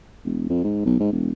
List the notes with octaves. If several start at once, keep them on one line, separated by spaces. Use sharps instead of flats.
E1
F2
G#2
B1
G#2
E1